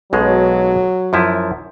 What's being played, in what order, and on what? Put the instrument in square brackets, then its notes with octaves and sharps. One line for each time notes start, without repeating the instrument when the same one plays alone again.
[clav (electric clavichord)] B1 B2 G#3 [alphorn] F#3
[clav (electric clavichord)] F#2 F3 E4